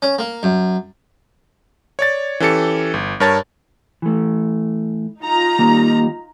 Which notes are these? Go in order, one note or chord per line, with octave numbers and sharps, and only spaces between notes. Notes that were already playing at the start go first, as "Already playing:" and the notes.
C#4
A#3
F#2
C#5 D5 A6
E3 C#4 G4 A4 A6 C#7
G1
G2 A#4 C#5 A5 A6
E3 A3
D#4 F4 A#5
D#3 G3 A#3